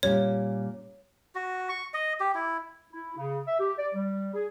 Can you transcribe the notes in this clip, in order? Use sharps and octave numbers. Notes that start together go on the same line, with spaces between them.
A#2 G3 C#4 C#5
F#4
C#6
D#5
G4
E4
E4
C#3
E5
G4
D5
G3
G#4